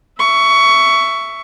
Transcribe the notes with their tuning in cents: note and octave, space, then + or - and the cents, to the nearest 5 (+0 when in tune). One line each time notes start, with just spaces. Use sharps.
E5 +10 C#6 +15